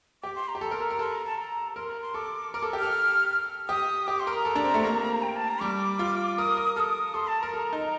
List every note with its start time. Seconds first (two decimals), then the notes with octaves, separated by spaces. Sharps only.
0.23 G4 D6
0.36 C6
0.48 A#5
0.55 G4
0.61 A4 A#5
0.71 A#4
0.80 A4
0.90 A#4
0.99 A4 C6
1.13 A#5
1.25 A5
1.38 A#5
1.76 A#4 C6
1.89 A#5
2.02 C6
2.14 A4 D6
2.54 A#4 D6
2.62 A4
2.73 G4
2.79 A4 F6
3.69 G4 D#6
4.07 G4 D6
4.20 C6
4.27 A#4
4.33 A#5
4.45 A4
4.56 D4
4.64 C4
4.74 A3
4.84 A#3
5.22 G5
5.35 A5
5.48 A#5
5.61 G3 D6
5.99 F4
6.38 A#4 D#6
6.57 A#4
6.76 A4 D#6 F6
7.14 A4 C6
7.28 A5
7.40 A#4 A#5
7.54 A4
7.73 D#4